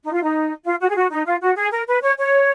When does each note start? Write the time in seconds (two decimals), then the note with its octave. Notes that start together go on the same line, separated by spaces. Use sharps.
0.04 D#4
0.14 F4
0.23 D#4
0.65 F4
0.81 F#4
0.90 G#4
0.96 F#4
1.11 D#4
1.26 F4
1.41 F#4
1.57 G#4
1.72 A#4
1.87 B4
2.02 C#5
2.19 C#5